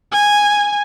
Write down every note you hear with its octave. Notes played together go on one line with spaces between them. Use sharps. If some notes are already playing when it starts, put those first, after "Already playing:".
G#5